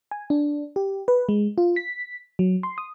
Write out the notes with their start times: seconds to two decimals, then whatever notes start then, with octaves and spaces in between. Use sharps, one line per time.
0.11 G#5
0.30 D4
0.76 G4
1.08 B4
1.29 G#3
1.58 F4
1.76 B6
2.39 F#3
2.63 C6
2.78 D#6